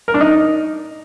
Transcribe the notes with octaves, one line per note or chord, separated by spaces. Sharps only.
A#4
D4
D#4